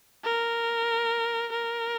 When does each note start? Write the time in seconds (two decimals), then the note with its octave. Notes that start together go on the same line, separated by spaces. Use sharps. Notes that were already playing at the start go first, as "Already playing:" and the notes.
0.24 A#4
1.52 A#4